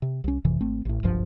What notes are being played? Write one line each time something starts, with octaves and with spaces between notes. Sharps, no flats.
C3
C2 C#4
G#1 F2 C3 E3
G#1 A3 C4
A1 A2
F#1 C2 G2 F3